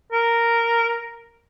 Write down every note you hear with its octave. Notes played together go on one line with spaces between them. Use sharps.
A#4